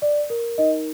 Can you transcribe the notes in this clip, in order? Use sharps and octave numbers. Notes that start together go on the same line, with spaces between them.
D5
A#4
D#4 D#5